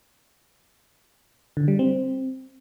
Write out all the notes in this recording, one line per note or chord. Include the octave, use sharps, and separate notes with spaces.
D3
G3
C4